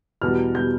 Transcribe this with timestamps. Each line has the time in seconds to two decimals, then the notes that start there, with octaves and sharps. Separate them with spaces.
0.22 E2 B2 G3 F6
0.55 B2 G3 G6